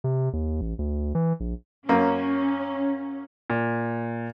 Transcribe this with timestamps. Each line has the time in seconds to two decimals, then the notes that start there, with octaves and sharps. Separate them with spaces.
0.04 C3
0.33 D#2
0.61 A1
0.79 D2
1.15 E3
1.40 A#1
1.89 F#2 A#3 C#4
3.50 A#2